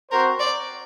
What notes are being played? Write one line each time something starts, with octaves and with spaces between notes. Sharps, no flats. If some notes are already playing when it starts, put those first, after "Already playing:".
C4 F#4 A#4 C5
D5